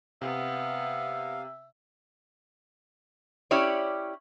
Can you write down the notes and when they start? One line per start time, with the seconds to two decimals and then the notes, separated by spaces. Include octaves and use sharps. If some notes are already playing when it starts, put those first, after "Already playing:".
0.22 C3 B3 E5 F5
3.51 C#4 E4 G4 C#5 D5